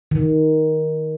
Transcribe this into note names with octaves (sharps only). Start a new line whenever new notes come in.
D#3